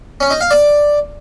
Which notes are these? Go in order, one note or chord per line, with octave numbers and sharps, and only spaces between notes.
C#4
D#4
F5
D5